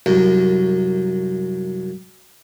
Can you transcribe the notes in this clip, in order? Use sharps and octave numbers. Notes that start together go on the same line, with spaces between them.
C2 F#2